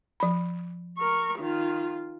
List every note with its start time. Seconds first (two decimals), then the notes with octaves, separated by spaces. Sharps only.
0.20 F3 B5
0.98 A#4 C#6
1.38 D#3 F4